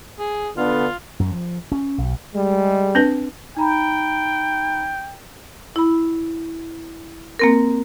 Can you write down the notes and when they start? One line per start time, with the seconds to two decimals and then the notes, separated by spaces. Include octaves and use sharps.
0.19 G#4
0.57 D3 B3 F4
1.20 F#2
1.32 F3
1.72 C#4
1.98 B1
2.34 G3 G#3
2.95 C4 D4 B4
3.57 D#4 G5 A#5 B5
5.76 E4 B5
7.39 A#3 C4 A#4